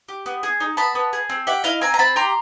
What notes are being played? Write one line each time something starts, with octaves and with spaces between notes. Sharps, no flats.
G4
B3
G#4
D#4
B3 A5 B5
B3
G#4
C4
G4 E5 F#5
E4 D#5 F5
C4 G#5 A#5
A#5
C4 A5 B5
G4 A#5 C6